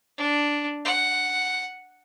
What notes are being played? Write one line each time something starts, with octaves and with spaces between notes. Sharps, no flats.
D4
F#5